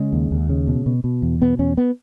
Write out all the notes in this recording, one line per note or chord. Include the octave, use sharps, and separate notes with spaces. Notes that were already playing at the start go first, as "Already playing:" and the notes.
Already playing: C#3 G#3
D#2
D#2
C#3
B2
B2
B2
E2
B2 B3
E2 C#4
B3